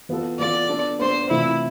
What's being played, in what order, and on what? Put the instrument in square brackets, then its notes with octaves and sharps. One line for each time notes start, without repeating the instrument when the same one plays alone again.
[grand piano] E3 B3 F4 A4
[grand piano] E3 B3 F4 A4 [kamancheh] D5
[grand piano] B3 D4 A4
[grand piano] B3 D4 A4 [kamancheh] C5
[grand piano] C3 E3 A3 C4 F4 [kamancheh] E4